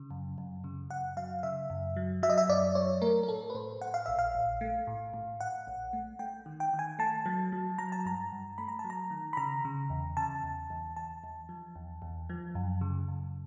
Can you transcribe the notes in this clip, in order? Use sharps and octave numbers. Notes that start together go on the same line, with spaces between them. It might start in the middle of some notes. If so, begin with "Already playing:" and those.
Already playing: C#3
F#2
F#2
C#3
F#2 F#5
F#3 F5
C#3 E5
F#2
F#3
F#3 E5
D#5
E5
F#2 D5
F#3 C#5
A3 A#4
A#4
A2 A4
B4
A2 C5
A2 F#5
F5
A#1 E5
F5
A#1
A3
A2
A2
A2 F#5
A#1
A3
A3 G5
D#3
G5
D#3
G#5
A3 A5
F#3
F#3
F#3 A#5
A5
G2 A#5
G2
A3 B5
A#5
A5
F#3
A#5
D#3
B5
C#3 A#5
C#3
E2
C#3 A5
E2
E2
E2 A5
E2
F3
E2
E2
F3
F#2
C#3
F#2